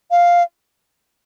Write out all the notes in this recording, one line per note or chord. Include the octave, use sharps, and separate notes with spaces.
F5